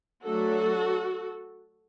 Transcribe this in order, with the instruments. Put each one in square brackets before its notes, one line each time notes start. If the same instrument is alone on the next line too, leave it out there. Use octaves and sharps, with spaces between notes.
[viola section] F#3 A3 D4 F#4 A4